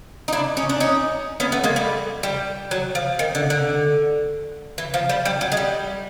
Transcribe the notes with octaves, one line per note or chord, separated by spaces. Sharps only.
D#4
D4 E4
C#4 D#4
D4
C#4 D#4
B3 C#4
A3 B3
G#3 A#3
G3 A3
G3
F#3
F3
D#3
D3
D3
E3
F3
G3
G3
F#3
G#3
G3